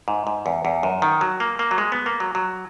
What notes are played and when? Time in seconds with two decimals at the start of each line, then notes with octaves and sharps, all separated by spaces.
0.08 G#2
0.27 G#2
0.46 E2
0.65 E2
0.83 F#2
1.02 D#3
1.21 F#3
1.40 A#3
1.59 A#3
1.71 F#3
1.78 G#3
1.92 B3
2.06 A#3
2.20 F#3
2.35 F#3